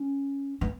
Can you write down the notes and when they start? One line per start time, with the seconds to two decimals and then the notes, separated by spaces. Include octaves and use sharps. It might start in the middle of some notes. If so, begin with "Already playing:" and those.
Already playing: C#4
0.61 B3